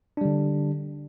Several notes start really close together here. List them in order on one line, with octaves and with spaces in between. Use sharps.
D4 G3 D3